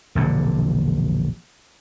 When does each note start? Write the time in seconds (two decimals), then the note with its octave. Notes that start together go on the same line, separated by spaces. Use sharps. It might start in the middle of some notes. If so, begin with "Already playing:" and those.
0.15 E1 A#1 A#2 D3